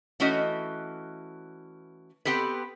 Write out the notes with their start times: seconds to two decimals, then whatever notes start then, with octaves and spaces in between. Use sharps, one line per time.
0.20 E3 A3 C#4 F#4 D#5
2.25 B3 C4 G4 A4 B4